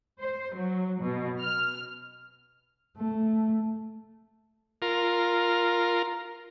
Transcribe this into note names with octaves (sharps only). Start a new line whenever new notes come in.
C5
F#3
B2
F6
A3
F4 A#4